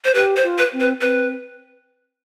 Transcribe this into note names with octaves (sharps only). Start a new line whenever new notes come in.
C5
G4 B4
C5
F4
B4
C4
B4
C4 B4